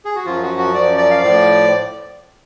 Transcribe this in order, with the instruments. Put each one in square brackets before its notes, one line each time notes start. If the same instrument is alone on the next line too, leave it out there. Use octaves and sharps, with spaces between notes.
[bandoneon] G#4
F#4
F#2 F3 F4
F#4
F#4
F#2 F3 D5
D5
F5
A2 F3 D5